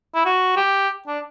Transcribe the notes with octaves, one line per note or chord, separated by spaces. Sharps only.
E4
F#4
G4
D4